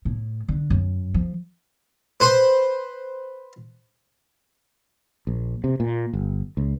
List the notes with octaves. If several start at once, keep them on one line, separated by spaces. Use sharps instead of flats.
A2
D3
F#2
F3
B4 C5 B5 C6
A#1
C3
A#2
G1
C#2